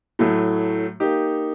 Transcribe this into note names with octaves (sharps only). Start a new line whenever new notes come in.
A2 F#3 A3
A#3 D#4 G4